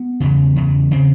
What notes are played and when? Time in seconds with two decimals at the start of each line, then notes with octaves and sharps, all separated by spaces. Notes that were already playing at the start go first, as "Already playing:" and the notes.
Already playing: B3
0.20 E2 C#3
0.56 E2 C#3
0.91 C#3 C4